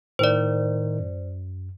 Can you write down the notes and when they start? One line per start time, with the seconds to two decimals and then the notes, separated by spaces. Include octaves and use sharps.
0.19 A2 D#3 C5 D5
0.99 F#2